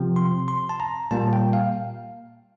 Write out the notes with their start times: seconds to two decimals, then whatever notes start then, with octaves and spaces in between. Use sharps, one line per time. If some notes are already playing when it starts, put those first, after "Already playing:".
Already playing: C3 F3 C4
0.16 C6
0.48 C6
0.69 A5
0.80 A#5
1.11 A#2 G3 A#3 A5
1.33 G5
1.53 F5